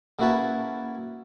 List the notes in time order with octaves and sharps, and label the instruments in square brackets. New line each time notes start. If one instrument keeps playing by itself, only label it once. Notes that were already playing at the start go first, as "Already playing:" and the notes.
[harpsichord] C#3 A#3 E4 F#4 B4 A5